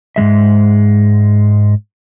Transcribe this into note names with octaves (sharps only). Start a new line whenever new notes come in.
G#2 G3 G#3 E5